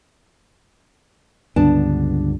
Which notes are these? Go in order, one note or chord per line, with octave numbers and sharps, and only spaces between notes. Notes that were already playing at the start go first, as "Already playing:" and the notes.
C#2 G2 D3 B3 D4 A5